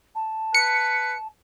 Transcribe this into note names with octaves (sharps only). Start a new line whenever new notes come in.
A5
B4 C#7